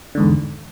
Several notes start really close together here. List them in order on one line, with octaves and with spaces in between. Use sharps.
D3 G#2 E2